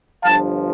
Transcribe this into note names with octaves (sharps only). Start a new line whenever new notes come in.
G1 G2 F3 F5 A5